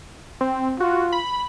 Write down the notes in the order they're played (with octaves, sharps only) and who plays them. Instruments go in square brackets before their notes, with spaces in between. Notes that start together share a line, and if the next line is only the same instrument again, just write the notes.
[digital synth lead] C4
[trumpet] F4 [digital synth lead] F#4
[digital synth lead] B5